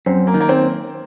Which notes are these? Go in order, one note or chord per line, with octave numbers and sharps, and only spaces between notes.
F#2 C4
A#3
D#3
A#3
C4